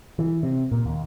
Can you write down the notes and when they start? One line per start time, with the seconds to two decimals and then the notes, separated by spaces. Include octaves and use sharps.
0.19 E3
0.43 C3
0.72 A#2
0.85 D#2